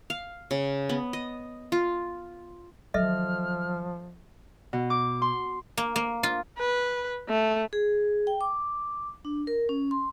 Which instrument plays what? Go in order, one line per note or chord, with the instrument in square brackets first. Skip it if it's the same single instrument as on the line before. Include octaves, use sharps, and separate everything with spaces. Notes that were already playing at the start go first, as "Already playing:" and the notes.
[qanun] F5
C#3
B3
D#5
F4
[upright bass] D#3 F#3 [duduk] F3 [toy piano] A4 D#5 E5 [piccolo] F6
[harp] B2
D6
C6
[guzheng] A#3
A#3
F4
[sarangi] B4
A3
[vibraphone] G#4
G5
D6
D4
A#4
C#4
C6